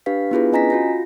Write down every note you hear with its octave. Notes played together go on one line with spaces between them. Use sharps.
D4 G4 B4 F5 B6
B3 D4 E4 F4 G#4 B4
C#4 D#5 G#5 A#5 A#6 B6
F4 F#4 A#6